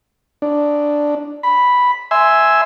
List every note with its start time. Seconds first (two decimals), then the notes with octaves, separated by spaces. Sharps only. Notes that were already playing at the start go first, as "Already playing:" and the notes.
0.42 D4
1.43 B5
2.11 E5 G#5 C6 E6